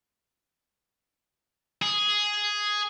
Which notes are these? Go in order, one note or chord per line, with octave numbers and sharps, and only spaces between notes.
G#4